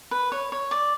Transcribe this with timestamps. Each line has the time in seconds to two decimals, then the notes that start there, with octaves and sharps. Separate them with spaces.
0.11 B4
0.32 C#5
0.52 C#5
0.71 D5